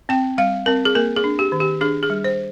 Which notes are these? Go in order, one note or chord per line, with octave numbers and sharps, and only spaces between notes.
C4 G5
G3 F5
C4 A#4
G#4
A#3 A#4
G#4
D4
G4
D#3
G4
D4 G#4
G#4
G3
C5